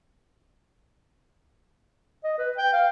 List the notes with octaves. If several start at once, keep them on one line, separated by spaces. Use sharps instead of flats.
D#5
B4
G5
F5